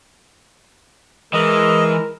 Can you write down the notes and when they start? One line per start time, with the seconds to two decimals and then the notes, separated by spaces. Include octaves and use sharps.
1.33 E3 G#3 A#4 D#5